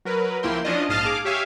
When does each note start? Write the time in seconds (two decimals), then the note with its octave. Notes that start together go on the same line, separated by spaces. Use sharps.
0.05 F#3 A#4 B4
0.43 C#2 F3 A#3 E4 G5 C6
0.64 F3 C#4 D4 F4 D#5
0.89 A#1 G#2 D#5 F5 A5 F6
1.05 G#4 F5 D6
1.25 G4 C#5 E5 F5 G#5